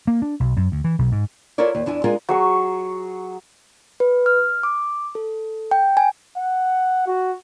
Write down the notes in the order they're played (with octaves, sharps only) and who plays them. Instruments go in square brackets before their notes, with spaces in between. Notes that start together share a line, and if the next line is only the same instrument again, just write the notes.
[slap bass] A#3
D4
B1
F#2
D2
E3
B1
G#2
[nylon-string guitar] E4 F4 A4 A#4 C#5 D5
D#2
E2 D4 E4 G#5
G#3 D4 F4 G#4 A#4
[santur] F#3 G#4 C#6
[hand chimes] B4
F6
D6
A4
G5
G#5
[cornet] F#5
F#4